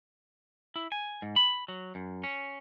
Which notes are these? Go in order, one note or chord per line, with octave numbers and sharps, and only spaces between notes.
E4
G#5
G#2
B5
F#3
F#2
C#4